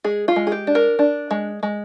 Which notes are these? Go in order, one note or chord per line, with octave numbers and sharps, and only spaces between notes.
G#3 G#4
F4
G#3
G#4
G4
D4
A#4
D4
G#3
G#3